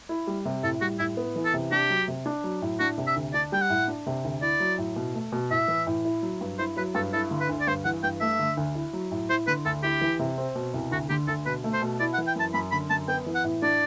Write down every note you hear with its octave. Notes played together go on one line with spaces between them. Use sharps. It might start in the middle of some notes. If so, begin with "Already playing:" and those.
E4
G3
C3
A2 A4
G3 F#4
A2 E4
B3
E3
A4
C3
D4 G4
F#3
C3
D4
F#3
A2
D4 F#4
C3
E5
D2
D4 D5
G3 G5
F#5
A2
D4
C3
D2
E4 D5
F#3
A2
B2
A3
B2
A2 E5
E3
A2
E4
F#3
G2
E4 C5
F#3 B4
G2 A4
E4 A4
D3
B4
D2
D5
G2 C5
E3 F#5
G2 G5
A3 E5
D3
D2
E4
F#3
A2
E4 C5
D3 B4
D2 A4
E4 G4
E3
C3
C4
B2
C2
D2 F#4
D3 G4
D2 A4
B2 B4
A3
C5
B2
E4 D5
F#5
E3
G5
F#2 A5
F#2 B5
D3 B5
F#2 A5
B3 G5
E3
F#5
A2
D4 D5